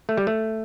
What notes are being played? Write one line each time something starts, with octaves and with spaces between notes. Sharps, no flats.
A3
G3
A3